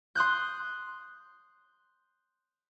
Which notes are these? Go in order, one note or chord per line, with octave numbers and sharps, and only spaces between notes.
C6 D#6 F#6 G6